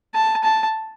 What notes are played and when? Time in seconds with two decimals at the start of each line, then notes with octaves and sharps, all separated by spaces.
0.14 A5
0.43 A5